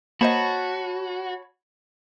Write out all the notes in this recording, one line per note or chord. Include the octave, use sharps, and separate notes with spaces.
A#3 F#4 C5 C#5 D#5 A5 B5